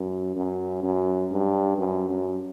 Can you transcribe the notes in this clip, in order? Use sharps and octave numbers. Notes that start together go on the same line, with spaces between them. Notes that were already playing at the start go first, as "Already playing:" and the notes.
Already playing: F#2
F#2
F#2
G2
F#2
F#2